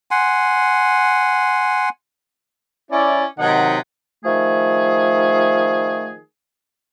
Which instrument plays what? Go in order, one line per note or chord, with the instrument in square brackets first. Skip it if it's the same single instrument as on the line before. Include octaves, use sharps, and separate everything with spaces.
[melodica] F#5 G#5 C6
[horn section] C#4 E4 D5
C3 D#3 F#3 D#4 F#5
[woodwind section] D#3 F3 A3 G#4